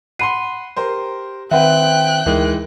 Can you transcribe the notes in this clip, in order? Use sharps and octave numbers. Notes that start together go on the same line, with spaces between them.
F#5 B5 C6 C7 D#7
G4 A#4 C5
D#3 C4 B4 E5 F#5 G5 F#6
D2 E3 G#3 D#4 A#4